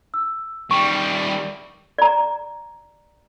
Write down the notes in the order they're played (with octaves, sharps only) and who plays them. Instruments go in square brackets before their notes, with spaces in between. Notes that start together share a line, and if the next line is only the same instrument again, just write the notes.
[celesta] E6
[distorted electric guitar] D#3 G3 [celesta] C#6
[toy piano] D5 A#5